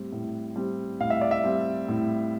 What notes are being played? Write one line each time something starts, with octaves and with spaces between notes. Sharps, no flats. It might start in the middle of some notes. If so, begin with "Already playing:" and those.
Already playing: A2 G3 C4
A2
G3 C4
A2 F5
E5
D5
E5
G3 C4
A2